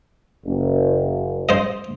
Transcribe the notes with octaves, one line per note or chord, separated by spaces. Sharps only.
F#1
C5 D#5